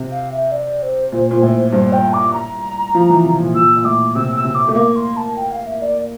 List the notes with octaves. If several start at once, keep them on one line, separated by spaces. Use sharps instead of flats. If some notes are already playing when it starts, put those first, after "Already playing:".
Already playing: C3
F5
E5
D5
C5
A#2
A#2
A2
G2 C5
G5
D6
A#5
F3
E3
C3
A#2
A#2 E6
A#2
A2 D6
C3 E6
E6
C3
D6
A3
A#3 D6
C6
A5
G5
F5
E5
D5